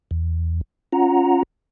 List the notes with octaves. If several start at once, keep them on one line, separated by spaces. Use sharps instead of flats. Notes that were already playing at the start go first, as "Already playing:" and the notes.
E2
C#4 F4 F#5 A#5